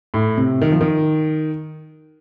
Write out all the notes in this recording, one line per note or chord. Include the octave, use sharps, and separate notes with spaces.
A2
C3
D#3
F3
D#3